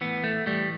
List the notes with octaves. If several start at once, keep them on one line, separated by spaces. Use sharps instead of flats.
A2 E3 B3
A3
A2 E3 G3